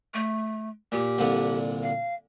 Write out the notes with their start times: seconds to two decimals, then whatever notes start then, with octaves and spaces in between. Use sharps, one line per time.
0.14 A3
0.92 A#2 G4
1.18 C2 A#2 D3
1.83 F5